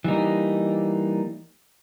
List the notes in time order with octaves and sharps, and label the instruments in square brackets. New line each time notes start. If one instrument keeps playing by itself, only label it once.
[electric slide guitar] E3 G3 A#3 D#4